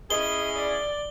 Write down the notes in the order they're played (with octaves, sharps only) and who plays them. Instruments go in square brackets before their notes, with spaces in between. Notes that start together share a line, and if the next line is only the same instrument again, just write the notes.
[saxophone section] C#4 E4 G#4 [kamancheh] D#5 B5 [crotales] G7
[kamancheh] D5